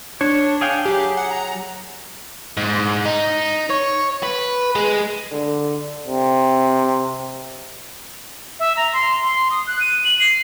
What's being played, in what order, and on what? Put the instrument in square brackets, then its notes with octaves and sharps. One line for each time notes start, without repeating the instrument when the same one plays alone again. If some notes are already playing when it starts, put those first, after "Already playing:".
[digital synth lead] D4 [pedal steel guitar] C#5
[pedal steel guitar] G#4 F5 G5
[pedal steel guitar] F#3 G#4 [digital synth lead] G4
[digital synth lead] F#5
A#5
[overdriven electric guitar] G#2
D#4
C#5
B4
G#3
[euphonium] D3
C3
[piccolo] E5
A#5
C6
C6
D#6
F#6
D#7
F#7
C7